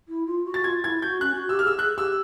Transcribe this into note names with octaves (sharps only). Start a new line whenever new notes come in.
E4
F4
F#4
A6
F4 G#6
E4 G#6
F#4 G6
C#4 F#6
F#4
G4 E6
F6
G#4 E6
G#4 F#6
G4 E6